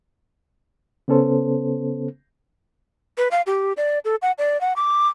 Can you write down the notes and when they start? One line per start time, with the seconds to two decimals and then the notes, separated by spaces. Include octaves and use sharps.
1.08 C#3 B3 C#4 A4 C5
3.18 B4
3.31 F5
3.47 G4
3.77 D5
4.05 A4
4.22 F#5
4.38 D5
4.61 F#5
4.76 D6